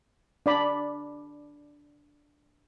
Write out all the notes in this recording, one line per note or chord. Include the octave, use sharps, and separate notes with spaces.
D4 D5 B5